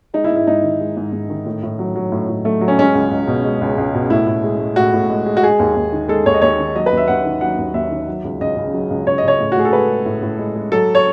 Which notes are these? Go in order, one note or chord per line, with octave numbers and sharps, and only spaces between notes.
G#3 D#4
E4
G#2
E4
G#2 D#4
D#3
G#3
G#2
G#2
D#3
A2
A2
F#3
F#3
A2
A2
F#3 A3
F#3
C#4
G#3 C#4
C#2
C#2
B2
G#3
C#2
C#2
B2
A2 E4
A2
G#3
G#3
A2 F#4
A2
G#3
G#3
F#4
G#3 G#4
D#2
D#2
D#3
G#3 A4
D#2 C#5
D#5
D#2 C#5
D#3
F#3 D#5
B4
D#2
E5
D#2 F#5
D#3
F#3 F#5
D#2
D#2 E5
D#3
F#3
C#2
C#2 D#5
C#3
F#3
C#2
C#2 C#5
D#5
C#3 C#5
A2
F#4
A2 G#4
A4
G#3 B4
G#3
A2
A2
G#3
G#3
F#3 A4
C#5